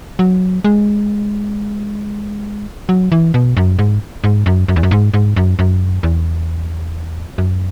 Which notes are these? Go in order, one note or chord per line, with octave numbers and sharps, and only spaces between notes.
F#3
G#3
F#3
E3
B2
F#2
G#2
G#2
F#2
F#2
E2
F#2
G#2
G#2
F#2
F#2
E2
F#2